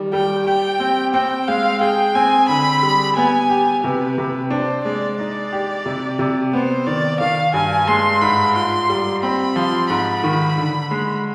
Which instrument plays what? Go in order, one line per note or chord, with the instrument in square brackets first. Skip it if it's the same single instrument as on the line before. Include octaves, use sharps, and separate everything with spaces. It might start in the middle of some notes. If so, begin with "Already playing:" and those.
Already playing: [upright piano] D#3 G3
[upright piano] G3 [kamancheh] G5
[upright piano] G4 [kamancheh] G5
[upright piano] C4
[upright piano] C4 [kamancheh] G5
[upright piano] G#3 [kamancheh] F5
[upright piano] G#4 [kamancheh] G5
[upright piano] C4 [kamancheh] G#5
[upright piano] D3 [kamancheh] B5
[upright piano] G3
[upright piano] B3 [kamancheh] G#5
[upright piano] G4
[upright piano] C3 [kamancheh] B4
[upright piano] C3
[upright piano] D4 [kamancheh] C5
[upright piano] G#3 [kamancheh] D5
[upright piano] D#4 [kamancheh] D5
[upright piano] G4
C3
C3
[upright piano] B3 [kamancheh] C5
[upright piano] D#3 [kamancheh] D5
[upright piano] D#3 [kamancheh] F5
[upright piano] G2 [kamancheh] G#5
[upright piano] G#3 [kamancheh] C6
[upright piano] G#2 [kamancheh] B5
[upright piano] F4 [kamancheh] C6
[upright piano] G3
[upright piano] C4 [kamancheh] B5
[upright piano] F3 [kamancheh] C6
[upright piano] G#2 [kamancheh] B5
[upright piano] D#3
D3
G#3